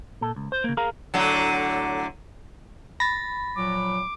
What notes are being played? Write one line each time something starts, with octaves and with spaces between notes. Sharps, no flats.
A#2 A4
C#2
C5
C#3 A#3
G#4 A#4 F5 A#5
A2 D3 F#3
B5 A6 A#6
A#2 F3 F#3 D6